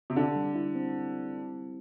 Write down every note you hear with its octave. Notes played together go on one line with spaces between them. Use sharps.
C3
D3 G4
G3
E4
C4